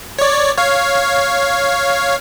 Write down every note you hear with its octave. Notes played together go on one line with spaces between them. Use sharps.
C#5 D5
C#5 F5